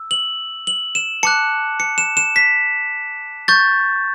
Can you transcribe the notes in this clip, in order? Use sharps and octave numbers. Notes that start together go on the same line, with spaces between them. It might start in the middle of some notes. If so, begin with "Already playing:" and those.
Already playing: E6
F#7
F#7
E7
A5 D6 F#6 C#7
C#7
E7
E7
B6
C#6 G6 A6